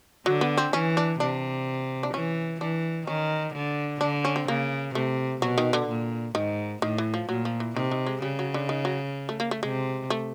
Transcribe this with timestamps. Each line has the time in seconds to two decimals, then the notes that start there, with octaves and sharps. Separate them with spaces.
0.26 D3 F#3
0.41 B3
0.57 C4
0.73 E3 C#4
0.97 D4
1.20 C3 D4
2.03 D4
2.14 E3 C#4
2.60 E3 D4
3.07 D#3 C#4
3.54 D3
4.00 D3 D4
4.25 C#4
4.36 C4
4.48 C#3 A#3
4.95 C3 A3
5.41 B2 F#3
5.58 D#3
5.73 D3
5.89 A#2
6.35 G#2 D#3
6.82 A2 D#3
6.98 E3
7.14 F3
7.29 A#2 F#3
7.45 F3
7.60 E3
7.76 C3 D#3
7.91 D#3
8.07 G#3
8.22 C#3 G3
8.39 F#3
8.54 D3
8.69 D#3
8.85 F#3
9.29 A3
9.40 A#3
9.51 A3
9.63 C3 G#3
10.10 A3